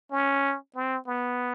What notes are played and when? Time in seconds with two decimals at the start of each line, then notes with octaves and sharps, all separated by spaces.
0.12 C#4
0.75 C4
1.07 B3